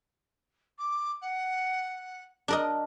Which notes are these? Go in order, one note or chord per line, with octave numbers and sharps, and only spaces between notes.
D6
F#5
D4 A#4 D#5